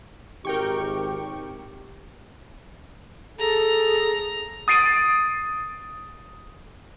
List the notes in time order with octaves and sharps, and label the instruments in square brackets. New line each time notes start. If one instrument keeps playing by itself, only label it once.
[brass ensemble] G#1 [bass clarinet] G4 [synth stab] A#4 G5 C#6
[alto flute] G#4 [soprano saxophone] A4 [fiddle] A#5
[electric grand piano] D#6 A6 C7 D7 D#7